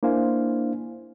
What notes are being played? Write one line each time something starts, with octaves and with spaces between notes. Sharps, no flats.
A#3 D4 E4 C5 F5 G#5